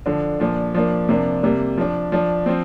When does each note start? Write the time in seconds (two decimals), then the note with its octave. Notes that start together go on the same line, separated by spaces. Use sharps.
0.06 D3 F3 D4
0.40 A#2 F3 D4
0.75 F3 A#3 D4
1.09 C3 F3 A#3 D4
1.43 C3 G3 A#3
1.78 F3 D4
2.12 F3 D4
2.46 F3 C4